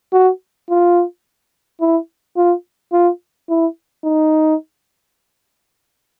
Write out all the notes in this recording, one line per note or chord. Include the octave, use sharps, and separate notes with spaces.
F#4
F4
E4
F4
F4
E4
D#4